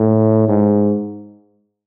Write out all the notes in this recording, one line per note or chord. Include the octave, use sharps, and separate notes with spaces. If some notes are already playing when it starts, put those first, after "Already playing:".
Already playing: A2
G#2